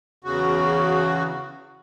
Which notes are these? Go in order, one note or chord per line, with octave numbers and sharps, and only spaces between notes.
E2 C#3 F#4